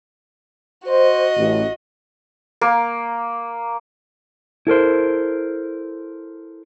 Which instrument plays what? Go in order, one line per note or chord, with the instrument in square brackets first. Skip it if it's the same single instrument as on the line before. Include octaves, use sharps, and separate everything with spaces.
[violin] F#4 D#5 [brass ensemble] C5
[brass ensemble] A1
[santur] A#3
[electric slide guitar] E4 A4 A#4 C5